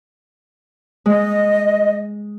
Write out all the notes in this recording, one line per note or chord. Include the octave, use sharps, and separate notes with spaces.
G#3 D#5